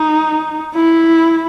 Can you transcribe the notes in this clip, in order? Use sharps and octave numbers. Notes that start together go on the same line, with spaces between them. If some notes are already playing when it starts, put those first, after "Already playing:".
Already playing: D#4
E4